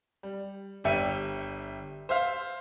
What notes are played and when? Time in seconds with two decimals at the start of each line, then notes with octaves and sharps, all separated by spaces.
0.23 G3
0.84 G1 G3 G4 E5 C#7 D#7
2.09 C5 E5 F5